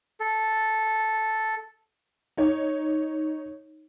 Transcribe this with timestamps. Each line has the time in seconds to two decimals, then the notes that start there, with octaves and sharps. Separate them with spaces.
0.20 A4
2.37 D#4 C#5